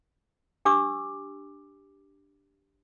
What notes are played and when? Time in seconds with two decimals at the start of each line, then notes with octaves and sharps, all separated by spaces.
0.65 D4 G4 D6 E6